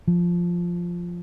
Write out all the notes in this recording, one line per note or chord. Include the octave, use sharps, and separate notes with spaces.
F3